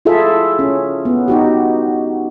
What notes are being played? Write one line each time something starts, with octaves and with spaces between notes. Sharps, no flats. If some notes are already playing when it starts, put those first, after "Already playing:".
E4 F4 G#4 A4 E5
C#4
B3
D#4 F#4 G4